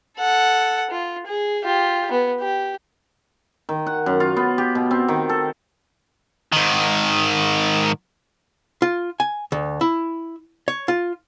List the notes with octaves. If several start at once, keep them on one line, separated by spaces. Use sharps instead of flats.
A4 F#5
F4
G#4
F4 G4
B3
G4
D#3
F#5
F#2
F4
B3
G4
B2
C4
D#3
A4
G#2 D#3
F4
G#5
D2
E4
C#5
F4